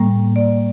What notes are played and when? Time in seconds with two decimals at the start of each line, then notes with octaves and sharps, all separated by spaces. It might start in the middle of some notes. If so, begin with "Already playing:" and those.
Already playing: A2 G3 A#3
0.36 D5